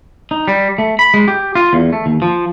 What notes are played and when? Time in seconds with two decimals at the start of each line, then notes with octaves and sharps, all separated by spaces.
0.31 D#4
0.48 G3
0.78 A3
0.99 B5
1.14 G#3
1.28 G4
1.55 F4
1.73 E2
1.93 A3
2.06 D#2
2.22 F3